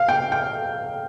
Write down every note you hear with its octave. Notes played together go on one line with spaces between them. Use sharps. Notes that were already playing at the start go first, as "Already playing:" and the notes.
Already playing: F5
G5
G5